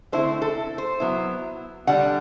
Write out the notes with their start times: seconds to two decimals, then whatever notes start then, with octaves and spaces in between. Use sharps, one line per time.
0.12 D3 A3 C4 E4 C5
0.42 A4
0.78 C5
1.00 F#3 B3 E4
1.87 D3 G3 D4 F#5